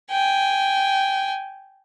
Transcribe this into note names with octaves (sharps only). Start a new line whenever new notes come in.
G5 G#5